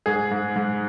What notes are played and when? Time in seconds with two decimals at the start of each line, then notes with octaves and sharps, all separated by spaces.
0.06 G#2 G#4
0.31 G#2
0.56 G#2